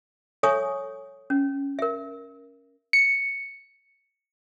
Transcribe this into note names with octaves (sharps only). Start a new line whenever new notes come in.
A4 C#5 E5 G#5 C#6 D#6
C#4
A#4 E5
C#7